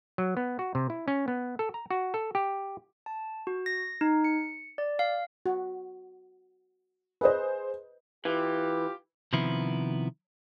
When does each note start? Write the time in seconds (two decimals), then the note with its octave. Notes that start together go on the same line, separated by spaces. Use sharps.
0.18 F#3
0.37 B3
0.59 F#4
0.75 C3
0.90 E4
1.08 C#4
1.28 B3
1.59 A4
1.74 A#5
1.91 F#4
2.14 A4
2.35 G4
3.06 A5
3.47 F#4
3.66 A#6
4.01 D#4
4.24 C#7
4.78 D5
4.99 F5
5.46 F#4
7.21 G#4 B4 C5 D#5
8.25 E3 F4 G4
9.33 C3 D#3 F3 B3 E4